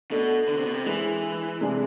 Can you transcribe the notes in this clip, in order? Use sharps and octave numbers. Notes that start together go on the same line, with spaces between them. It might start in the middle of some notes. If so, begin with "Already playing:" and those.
B2 A3 D4 A4
D3
C3
B2
C3
E3 G#3 D4 G#4 B4
C3 G#3 D4 G#4